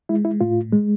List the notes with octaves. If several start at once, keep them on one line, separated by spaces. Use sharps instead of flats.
G#3 E4
E4
A2 F4
G#3